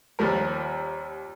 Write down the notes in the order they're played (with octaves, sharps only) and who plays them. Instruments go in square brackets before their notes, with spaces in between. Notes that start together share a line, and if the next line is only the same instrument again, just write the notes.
[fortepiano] D#2 F3 G3 A#4